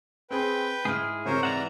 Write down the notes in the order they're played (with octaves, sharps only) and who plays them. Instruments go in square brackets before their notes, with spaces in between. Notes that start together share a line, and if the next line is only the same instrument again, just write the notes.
[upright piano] C4 G#4 B5 [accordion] B4 G5
[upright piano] G#2 F6 [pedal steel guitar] E4 G#4
[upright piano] G#2 C3 [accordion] A#4 C5 C#5
[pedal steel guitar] E3 E5 F#5 [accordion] D5 A#5